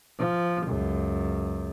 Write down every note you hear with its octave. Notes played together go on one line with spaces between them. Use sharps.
F3
C#2 F#2